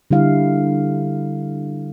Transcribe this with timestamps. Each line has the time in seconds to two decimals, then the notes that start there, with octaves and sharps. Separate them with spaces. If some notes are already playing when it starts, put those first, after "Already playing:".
0.11 D3 G3 E4 F5